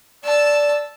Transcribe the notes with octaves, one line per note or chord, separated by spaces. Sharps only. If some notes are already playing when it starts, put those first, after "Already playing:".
D5 A5 E6